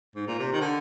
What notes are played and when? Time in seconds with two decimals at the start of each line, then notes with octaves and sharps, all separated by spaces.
0.16 G#2
0.27 A#2
0.39 C3
0.52 D#3
0.61 D3